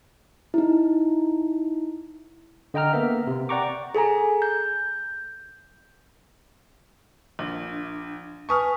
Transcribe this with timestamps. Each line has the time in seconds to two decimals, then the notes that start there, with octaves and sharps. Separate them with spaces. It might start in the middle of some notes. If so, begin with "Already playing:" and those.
0.54 D#4 E4
2.74 D3 D#5 G5 A#5 F6
2.93 A#3 B3 A#4 E5
3.27 C3
3.49 D5 F#5 G5 A#5 C#6 D6
3.95 G#4 A4 G#5 A#5
4.42 G6
7.39 A#1 D4
8.49 B4 G#5 A5 C#6 D#6 F6